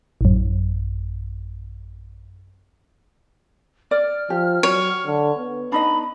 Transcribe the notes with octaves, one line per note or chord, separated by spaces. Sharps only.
A1 F#2
D5 F6
F3 G4
F#3 C#5
D3
B3
D4 D#4 D#5 B5